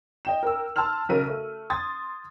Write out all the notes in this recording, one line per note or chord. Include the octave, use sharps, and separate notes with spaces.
D#5 G5 E7
A#4 G5 E6
A5 C6 E6 F6 F7
B1 C#3 A#4 D#7
A3
C6 D#6 G#6 A6